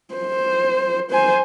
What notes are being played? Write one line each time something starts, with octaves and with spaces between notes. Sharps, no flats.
C5
C5 G#5